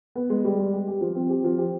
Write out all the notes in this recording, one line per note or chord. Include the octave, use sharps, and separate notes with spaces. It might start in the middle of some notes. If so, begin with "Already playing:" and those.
B3
G#3
G3
G4
G4
G4
F3
C4
G4
F3
G4